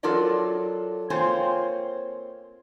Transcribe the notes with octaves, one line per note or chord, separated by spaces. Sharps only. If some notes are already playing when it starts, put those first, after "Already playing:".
F#3 F4 A4 A#4 D5 D#5
A#3 C4 F4 C5 C#5 G#5